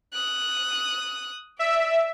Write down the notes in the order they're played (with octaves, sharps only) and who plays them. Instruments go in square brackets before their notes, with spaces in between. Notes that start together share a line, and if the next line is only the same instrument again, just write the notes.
[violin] D#6 F#6
[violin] D5 [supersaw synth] E5